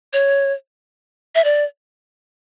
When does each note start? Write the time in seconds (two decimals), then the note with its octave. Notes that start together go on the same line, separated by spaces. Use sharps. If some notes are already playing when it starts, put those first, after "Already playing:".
0.13 C#5
1.35 E5
1.44 D5